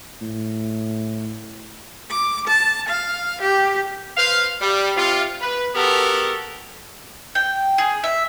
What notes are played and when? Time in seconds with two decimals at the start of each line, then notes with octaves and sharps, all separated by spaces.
0.21 A2
2.10 D6
2.47 A5
2.89 F5
3.41 G4
4.17 B4 C5 F5
4.61 G3
4.97 C3 F4
5.41 B4
5.75 B3 F#4 G4 A4 A#4
7.35 G5
7.78 G#4
8.04 E5